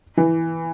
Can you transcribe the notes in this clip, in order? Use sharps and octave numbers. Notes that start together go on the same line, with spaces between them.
E3